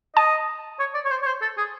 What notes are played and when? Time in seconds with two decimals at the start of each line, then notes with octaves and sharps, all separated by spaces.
0.16 D#5 A5
0.79 C#5
0.94 D5
1.05 C#5
1.11 C5
1.22 C#5
1.26 C5
1.41 A4
1.57 G#4